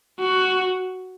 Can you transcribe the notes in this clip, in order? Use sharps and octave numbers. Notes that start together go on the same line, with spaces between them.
F#4